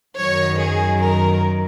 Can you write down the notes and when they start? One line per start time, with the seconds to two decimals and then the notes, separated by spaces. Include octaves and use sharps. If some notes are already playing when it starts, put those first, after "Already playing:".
0.17 F#2 D#3 F#3 C#5
0.60 G#4
1.03 A#4